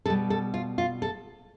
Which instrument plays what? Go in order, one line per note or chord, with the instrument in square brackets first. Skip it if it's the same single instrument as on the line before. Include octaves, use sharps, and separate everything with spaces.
[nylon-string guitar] B2 G3 A4
A4
F4
F4
A4